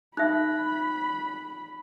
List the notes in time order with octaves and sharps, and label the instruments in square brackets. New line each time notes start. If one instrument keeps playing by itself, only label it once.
[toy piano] D#4 E5 [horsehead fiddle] B5 [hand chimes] F#6